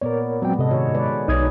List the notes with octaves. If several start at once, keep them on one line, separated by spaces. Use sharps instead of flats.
A#2 B3 A#4 C#5 D5
F#3 G#3 B3 C4 G5
G#2 C3 A4 D#5
D#3 F#4 C#5
G#3 B4 D5
B1 D#4 C#5 D#6 G#6